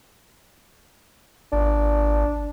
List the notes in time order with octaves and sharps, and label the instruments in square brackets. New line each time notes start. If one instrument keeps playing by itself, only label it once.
[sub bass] G#1 [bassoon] D4